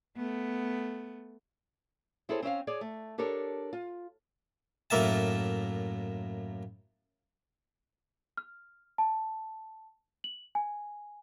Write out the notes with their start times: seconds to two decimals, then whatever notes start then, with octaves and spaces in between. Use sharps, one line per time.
0.17 A3 B3
2.29 C4 E4 G#4 A4 C5 C#5
2.42 C4 C#4 E5 F5
2.67 G#4 C#5 D5
2.81 A3
3.18 D4 G4 A4 A#4 C#5
3.73 F4
4.90 F#2 A2 A#3 E5 A5
8.37 F6
8.98 A5
10.24 F#7
10.55 G#5